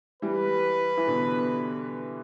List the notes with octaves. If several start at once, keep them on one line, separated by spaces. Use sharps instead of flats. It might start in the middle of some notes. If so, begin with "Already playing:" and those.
E3 G3 B4
E3
B2 D3